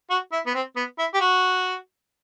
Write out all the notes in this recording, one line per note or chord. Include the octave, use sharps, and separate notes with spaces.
F#4
E4
B3
C4
B3
E4
G4
F#4